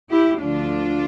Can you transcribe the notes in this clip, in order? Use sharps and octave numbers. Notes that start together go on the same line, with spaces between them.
E4 G4
D2 D3 F3 D4 F4